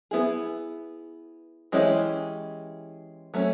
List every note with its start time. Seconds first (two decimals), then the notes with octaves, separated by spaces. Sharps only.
0.11 B3 E4 G#4
1.72 E3 G#3 C#4 E4 G4
3.34 F#3 A3 C#4